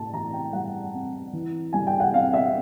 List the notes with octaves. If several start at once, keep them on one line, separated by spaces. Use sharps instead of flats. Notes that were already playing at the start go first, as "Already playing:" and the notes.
Already playing: A2 A5
E3 A#5
G5
G3 F#5
C4
E3
G3 G#5
G5
F#5
C4 F5
E5